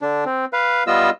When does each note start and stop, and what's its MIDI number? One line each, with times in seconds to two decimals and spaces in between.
0.02 0.24 50
0.02 0.24 62
0.25 0.45 60
0.53 0.83 71
0.53 0.83 77
0.87 1.10 55
0.87 1.10 59
0.87 1.10 65
0.87 1.10 75
0.87 1.10 88